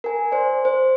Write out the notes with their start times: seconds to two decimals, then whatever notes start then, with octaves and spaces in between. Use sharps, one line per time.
0.04 A#4 G#5
0.32 C5 D5
0.65 C5